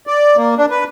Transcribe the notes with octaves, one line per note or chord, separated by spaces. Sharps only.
D5
A#3
D4
B4